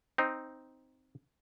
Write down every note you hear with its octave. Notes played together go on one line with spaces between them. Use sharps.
C4 D#4